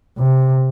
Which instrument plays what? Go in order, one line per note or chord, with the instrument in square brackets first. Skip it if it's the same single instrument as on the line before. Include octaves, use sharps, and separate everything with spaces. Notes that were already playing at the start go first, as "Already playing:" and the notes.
[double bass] C3